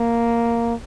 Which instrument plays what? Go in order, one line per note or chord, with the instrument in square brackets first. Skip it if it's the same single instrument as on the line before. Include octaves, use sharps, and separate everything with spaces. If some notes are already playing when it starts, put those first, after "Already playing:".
Already playing: [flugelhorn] A#3